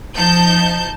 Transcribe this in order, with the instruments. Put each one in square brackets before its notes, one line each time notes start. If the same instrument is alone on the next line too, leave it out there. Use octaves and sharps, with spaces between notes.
[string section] F3 D#4 A5 G6